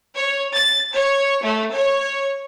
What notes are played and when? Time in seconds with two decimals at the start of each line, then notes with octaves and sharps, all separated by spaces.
0.15 C#5
0.54 A6
0.93 C#5
1.43 A3
1.75 C#5